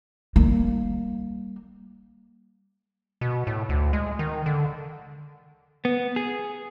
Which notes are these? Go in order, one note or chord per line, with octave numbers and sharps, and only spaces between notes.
G3 A#3
B2
A2
D2
G#3
D#3
D3
B3
G#4